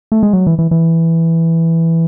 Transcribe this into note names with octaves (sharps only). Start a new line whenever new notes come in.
A3
G#3
F#3
E3
E3
E3